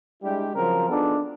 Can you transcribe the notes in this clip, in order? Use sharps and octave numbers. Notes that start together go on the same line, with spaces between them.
G3 G#3 D4 E4 G4
C#3 F3 F#3 C4 F4 A#4
B3 D4 D#4 F4 G#4 A4